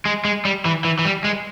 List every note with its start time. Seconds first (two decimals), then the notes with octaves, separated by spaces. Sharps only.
0.05 G#3
0.25 G#3
0.45 G3
0.65 E3
0.84 E3
0.99 E3
1.05 G3
1.24 G#3